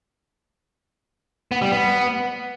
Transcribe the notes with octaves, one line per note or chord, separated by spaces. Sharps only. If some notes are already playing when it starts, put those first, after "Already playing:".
B3
G3
B3